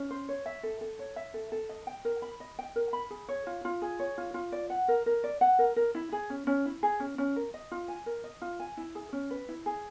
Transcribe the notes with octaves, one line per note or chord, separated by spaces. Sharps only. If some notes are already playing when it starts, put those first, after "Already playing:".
Already playing: C#4
C5
C#5
E5
A4
A4
C#5
E5
A4
A4
D#5
G5
A#4
B5
D#5
G5
A#4
B5
G#4
C#5
F4
F4
G#4
C#5
F4
F4
D5
F#5
A#4
A#4
D5
F#5
A#4
A#4
E4
G#4
C#4
C#4
E4
G#4
C#4
C#4
A#4
D#5
F4
G#5
A#4
D#5
F4
G#5
E4
G#4
C#4
B4
E4
G#4